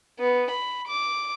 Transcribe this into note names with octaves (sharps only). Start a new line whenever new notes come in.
B3
B5
D6